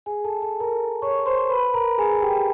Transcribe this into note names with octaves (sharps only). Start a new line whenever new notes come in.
G#4 G#5
A4 A5
A4 A5
A#4 A#5
C#5 C#6
C5 C6
B4 B5
A#4 A#5
G#4 G#5
G4 G5